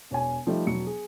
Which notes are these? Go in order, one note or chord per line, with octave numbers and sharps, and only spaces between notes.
E1 C#5 G#5
F3 G3 A3 D#4
E1 F#3 C#7
G#4